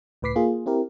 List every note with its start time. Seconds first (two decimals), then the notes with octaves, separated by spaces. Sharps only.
0.22 C#2 A2 B4 D6 B6 C7
0.36 A#3 F4 G#4
0.66 C4 E4 G4 A#4